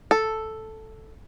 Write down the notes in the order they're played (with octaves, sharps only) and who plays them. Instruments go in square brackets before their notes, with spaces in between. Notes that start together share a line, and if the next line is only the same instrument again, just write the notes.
[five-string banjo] A4